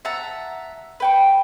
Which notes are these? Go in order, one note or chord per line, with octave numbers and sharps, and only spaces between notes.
E5 F#5 A5 A#5
B4 G5 C#6